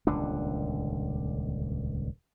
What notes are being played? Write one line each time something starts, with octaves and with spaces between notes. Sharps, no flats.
D#1 C#2 D3 D4